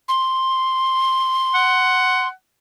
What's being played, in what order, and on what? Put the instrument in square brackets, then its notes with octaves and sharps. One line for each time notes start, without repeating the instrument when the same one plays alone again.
[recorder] C6
[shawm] F#5